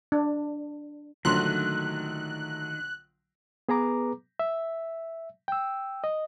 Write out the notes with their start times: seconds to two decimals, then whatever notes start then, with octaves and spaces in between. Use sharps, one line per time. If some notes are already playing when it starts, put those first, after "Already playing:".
0.12 D4
1.25 A#1 D3 D#3 F#3 A3 C6 F#6
3.69 B3 G#4 B4 A#5 D6
4.39 E5
5.48 G5 E6
6.04 D#5